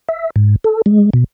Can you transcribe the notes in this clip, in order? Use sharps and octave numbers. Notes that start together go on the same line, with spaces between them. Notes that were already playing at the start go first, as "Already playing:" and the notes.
E5
G#2
A4
G#3
B2